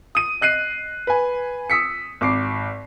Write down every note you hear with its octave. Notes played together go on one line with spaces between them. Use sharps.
D#6 D#7
D#5 F#6 C7 D#7
B4 G#5
D#6 E6 B6 C#7
G#1 D6 C7